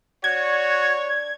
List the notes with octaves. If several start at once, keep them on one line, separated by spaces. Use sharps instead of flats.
D4 F#4 C#5 G#6